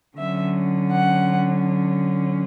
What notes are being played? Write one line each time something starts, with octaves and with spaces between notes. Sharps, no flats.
D3 F#3 C#4 E5
F#5